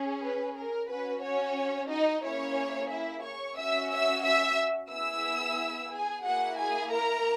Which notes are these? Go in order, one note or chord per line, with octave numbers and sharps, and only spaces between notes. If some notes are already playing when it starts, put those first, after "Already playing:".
Already playing: C#4 G#4
B4
A#4
C#4 F#4 B4
C#4 C#5
D#4 D#5
A#3 C#4 E4 G#4 C#5
E4 E5
C#5 C#6
C#4 F#4 E5 E6
E5 E6
E5 E6
B3 E4 G#4 E5 E6
G#4 G#5
A#3 E4 F#4 G#4 F#5
G#4 G#5
A#4 A#5